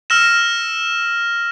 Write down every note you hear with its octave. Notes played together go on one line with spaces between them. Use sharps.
E6 F6 A#6 E7